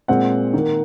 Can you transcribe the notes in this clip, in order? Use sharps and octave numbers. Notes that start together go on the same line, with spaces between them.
A#2 G#3 C4 F#5
D#3 A#3